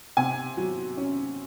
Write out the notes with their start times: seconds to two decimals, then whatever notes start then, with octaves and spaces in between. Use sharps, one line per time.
0.17 C3 G#5
0.57 F#3
0.97 C#4